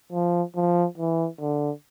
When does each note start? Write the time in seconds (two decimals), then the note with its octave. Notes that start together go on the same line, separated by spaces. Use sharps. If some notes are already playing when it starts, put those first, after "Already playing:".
0.12 F3
0.55 F3
0.98 E3
1.41 D3